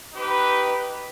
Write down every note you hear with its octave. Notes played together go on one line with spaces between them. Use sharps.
D#4 G4 B4